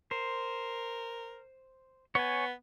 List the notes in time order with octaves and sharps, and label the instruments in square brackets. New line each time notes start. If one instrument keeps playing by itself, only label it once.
[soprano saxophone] A#4 [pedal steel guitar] C5
[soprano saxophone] B3 [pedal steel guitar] C#5 G#5